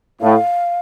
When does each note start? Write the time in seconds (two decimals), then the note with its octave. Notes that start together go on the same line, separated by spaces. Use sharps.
0.21 A2 F5